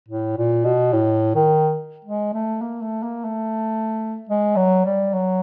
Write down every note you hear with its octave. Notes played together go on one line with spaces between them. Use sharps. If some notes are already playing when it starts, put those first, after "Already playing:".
A2
A#2
B2
A2
D#3
G#3
A3
A#3
A3
A#3
A3
G#3
F#3
G3
F#3